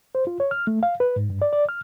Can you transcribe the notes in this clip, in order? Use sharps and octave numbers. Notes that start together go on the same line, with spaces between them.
C5
F4
C#5
F6
A3
F5
B4
G#2
G2
D5
D5
F6